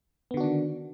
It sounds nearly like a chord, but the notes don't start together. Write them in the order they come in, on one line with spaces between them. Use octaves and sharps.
B3 D3 F#4 D4 D#3